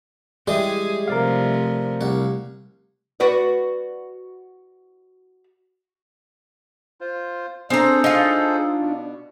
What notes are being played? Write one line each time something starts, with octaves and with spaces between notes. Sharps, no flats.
E3 G3 G#3 G4 G#4 D#5
C3 F3 A3 A#4 D5 F5
C2 F#5
F#4 B4 D5
F4 C5
C4 D4 G#4 A4 C5 A#5
D#4 F4
B2